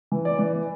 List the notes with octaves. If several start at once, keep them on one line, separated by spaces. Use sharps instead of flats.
E3
D5
E3